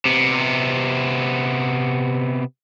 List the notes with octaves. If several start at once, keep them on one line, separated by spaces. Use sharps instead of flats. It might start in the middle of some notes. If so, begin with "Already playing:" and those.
C3 B3